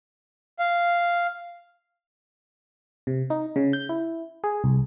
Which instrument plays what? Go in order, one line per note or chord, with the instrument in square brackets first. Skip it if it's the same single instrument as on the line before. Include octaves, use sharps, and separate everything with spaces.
[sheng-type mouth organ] F5
[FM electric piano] C3
D#4
C#3
G6
E4
G#4
C2